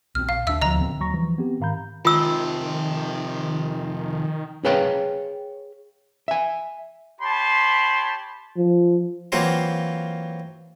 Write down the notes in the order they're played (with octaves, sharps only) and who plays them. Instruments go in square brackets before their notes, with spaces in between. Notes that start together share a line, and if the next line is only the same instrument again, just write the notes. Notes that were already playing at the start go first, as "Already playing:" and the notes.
[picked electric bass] A#1 C4 [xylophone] F6
[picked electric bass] A#1 [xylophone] F5
[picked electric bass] D#2 D4 [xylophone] E5 E6
[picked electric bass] D2 F3 [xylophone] D#5 A#5
[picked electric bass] D#1 D3 C4
[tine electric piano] D#2 F#3 A#5 C#6 A#6
E3 F3 G3
B3 C4 G4
G#2 D#3 F5 A#5 B5 G6
[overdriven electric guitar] C3 F3 [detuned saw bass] D#3 [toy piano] F4 E6
[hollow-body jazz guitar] G#4 B4 C#5 F5 G5
E5 G#5
[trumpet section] G4 C#5 A5 B5 C6
[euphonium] F3
[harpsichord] E3 F#3 A#3 C4 F4 F#4